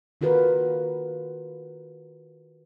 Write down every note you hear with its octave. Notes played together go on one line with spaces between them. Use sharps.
D#3 F4 F#4 A#4 B4